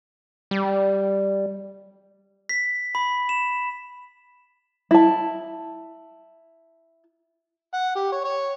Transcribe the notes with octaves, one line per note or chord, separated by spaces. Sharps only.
G3
B6
B5
E7
E4 A5
F#5
G4
C#5
C#5